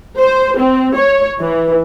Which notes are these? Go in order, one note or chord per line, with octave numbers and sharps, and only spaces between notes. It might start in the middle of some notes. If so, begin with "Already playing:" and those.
C5
C4
C#5
E3